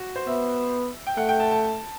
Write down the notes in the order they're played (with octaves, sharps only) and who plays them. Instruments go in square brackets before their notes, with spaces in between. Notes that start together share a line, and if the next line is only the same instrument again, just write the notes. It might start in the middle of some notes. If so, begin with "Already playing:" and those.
Already playing: [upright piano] F#4
C5
[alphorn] B3 [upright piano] E5
[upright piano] G5
[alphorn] A3 [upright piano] F#5
[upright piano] G5
A5
A5